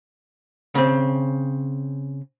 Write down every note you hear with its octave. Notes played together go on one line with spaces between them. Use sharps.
C#3 C4